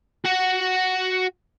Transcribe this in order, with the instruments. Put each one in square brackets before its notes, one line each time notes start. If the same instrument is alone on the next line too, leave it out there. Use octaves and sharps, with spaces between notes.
[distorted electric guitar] F#4 F#5